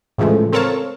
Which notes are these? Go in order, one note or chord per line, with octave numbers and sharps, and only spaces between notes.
A2 C#3 E3 F3 G#3 A3
C4 A4 A#4 C#5 F5 A5